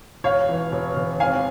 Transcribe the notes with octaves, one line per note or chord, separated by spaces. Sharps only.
E1 C#5 F5
E3
E1
E1
G#1 F5 G#5